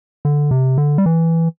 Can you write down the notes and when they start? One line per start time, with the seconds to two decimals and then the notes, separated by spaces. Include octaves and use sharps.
0.25 D3
0.51 C3
0.78 D3
0.98 G3
1.06 E3